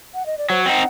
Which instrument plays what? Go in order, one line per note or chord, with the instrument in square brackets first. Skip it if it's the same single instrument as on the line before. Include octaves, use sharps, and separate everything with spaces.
[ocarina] F#5
D#5
D5
[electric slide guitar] F#3 [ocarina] C5
[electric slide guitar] C4 D#4 [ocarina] F#5